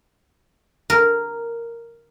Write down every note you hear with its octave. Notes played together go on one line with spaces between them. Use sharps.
A#4